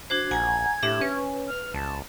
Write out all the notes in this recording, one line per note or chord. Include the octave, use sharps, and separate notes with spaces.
D4 F#4 C5 G#6
A#1 F#5 G#5 A#5
A2 D4 G4 E5
C#4 B4
F6
C#2 A5